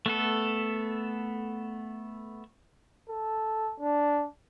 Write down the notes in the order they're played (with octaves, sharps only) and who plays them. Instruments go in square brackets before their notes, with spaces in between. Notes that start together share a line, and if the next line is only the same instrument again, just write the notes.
[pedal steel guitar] A3 B3 A4
[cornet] A4
D4